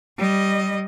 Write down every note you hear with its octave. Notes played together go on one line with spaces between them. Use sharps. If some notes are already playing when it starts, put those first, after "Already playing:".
G3 D#5